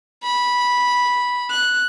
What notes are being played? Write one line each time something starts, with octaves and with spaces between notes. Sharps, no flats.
B5
F#6